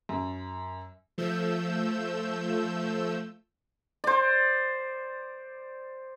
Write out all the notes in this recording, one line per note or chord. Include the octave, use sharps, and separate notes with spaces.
F#2
F3 A3 E6 G6
C5 D5